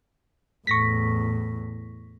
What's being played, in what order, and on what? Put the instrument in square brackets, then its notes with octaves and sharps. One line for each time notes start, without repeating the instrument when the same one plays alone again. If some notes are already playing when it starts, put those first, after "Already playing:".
[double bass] E2 A2 [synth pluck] C#6 A#6 B6